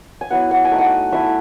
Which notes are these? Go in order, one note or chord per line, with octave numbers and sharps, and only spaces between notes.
G#5
F#3 B3 E4 F#5
F#5
G#5
A3 D#4
F#5
A3 E4 E5